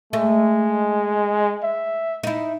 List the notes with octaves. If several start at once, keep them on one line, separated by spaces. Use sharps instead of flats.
G#3 A3
E5
D#4 E4